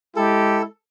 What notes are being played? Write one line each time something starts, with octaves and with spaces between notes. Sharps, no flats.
G#3 E4 G4 A4